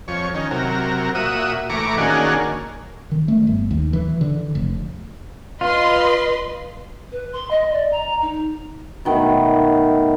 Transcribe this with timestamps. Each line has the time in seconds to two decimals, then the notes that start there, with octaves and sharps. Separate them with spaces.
0.08 F2 C#5
0.34 D#3 C#4
0.51 C3 F#3 A#4
1.15 A#2 F#4 E5 D#6
1.70 A2 E3 A#5 C#6 D6
1.98 D#3 A#3 C#4 D4 F#4 G#4
3.11 D#3
3.28 A3
3.47 G1
3.71 D#2
3.93 E3
4.21 D3
4.55 F1
5.61 F4 B4 D#5 C6
7.11 B4
7.32 C6
7.50 D#5
7.72 D5
7.91 A#5
8.21 D#4
9.05 B2 D#3 A3